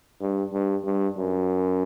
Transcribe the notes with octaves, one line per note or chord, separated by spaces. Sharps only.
G2
G2
G2
F#2